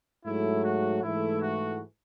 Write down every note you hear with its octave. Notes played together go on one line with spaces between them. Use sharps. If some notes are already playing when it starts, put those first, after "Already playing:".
G#2 F#3 A3 E4
F#4
G#2 E3 A3 E4
F#4